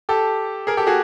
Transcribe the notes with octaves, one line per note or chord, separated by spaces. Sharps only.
G4 A4
G#4 A#4
G4 A4
F#4 G#4